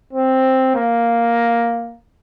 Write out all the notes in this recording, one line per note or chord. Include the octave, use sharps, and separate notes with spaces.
C4
A#3